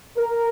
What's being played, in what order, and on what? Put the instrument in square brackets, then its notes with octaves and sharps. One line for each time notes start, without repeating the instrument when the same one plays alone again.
[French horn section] A#4